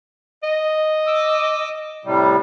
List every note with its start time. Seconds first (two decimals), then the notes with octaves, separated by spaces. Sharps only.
0.43 D#5
1.07 D6 E6
2.05 A2 C3 G3